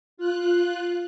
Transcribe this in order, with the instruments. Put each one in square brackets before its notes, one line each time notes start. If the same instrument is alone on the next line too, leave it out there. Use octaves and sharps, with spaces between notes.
[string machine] F4 F#6